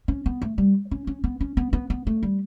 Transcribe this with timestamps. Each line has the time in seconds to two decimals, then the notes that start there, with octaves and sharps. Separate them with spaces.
0.08 C#4
0.26 B3
0.42 A3
0.58 G3
0.91 C#4
1.07 C#4
1.24 B3
1.41 C#4
1.57 B3
1.73 B3
1.90 B3
2.07 A3
2.23 G3